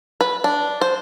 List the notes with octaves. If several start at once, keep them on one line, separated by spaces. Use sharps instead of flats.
B4
D4
C5